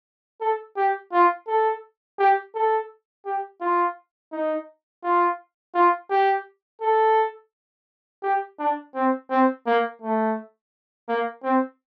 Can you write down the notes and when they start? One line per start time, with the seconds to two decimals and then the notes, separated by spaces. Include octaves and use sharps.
0.41 A4
0.77 G4
1.12 F4
1.48 A4
2.19 G4
2.55 A4
3.25 G4
3.61 F4
4.32 D#4
5.04 F4
5.75 F4
6.10 G4
6.81 A4
8.23 G4
8.59 D4
8.95 C4
9.30 C4
9.66 A#3
10.01 A3
11.08 A#3
11.43 C4